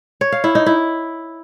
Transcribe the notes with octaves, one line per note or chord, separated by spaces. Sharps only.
C#5
F5
E4
D#4
E4